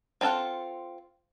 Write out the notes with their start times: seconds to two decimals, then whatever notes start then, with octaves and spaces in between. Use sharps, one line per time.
0.21 C4 D#4 F4 A4 F#5